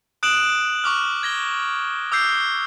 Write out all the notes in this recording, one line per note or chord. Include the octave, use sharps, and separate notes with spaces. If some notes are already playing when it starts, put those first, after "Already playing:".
D#6 F#6 D7 E7 F#7
C#6 D6 F6
G#6 A#6 G7
D6 E6 G6 C7